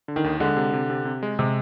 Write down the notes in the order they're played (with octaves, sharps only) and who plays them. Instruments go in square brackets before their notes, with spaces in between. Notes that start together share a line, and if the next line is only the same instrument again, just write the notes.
[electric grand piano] D3
[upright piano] D#3
[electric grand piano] D#2
[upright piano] D3 [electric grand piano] G#3
[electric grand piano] C3
C3
C3
C3
G#3
[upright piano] C3 [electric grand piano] G#3